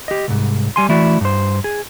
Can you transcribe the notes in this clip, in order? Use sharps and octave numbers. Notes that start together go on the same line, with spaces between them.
G4 D#5
C2 G#2
G3 G#5 C6
E3 A3 E4 F#4 D5
G2 C5
G#4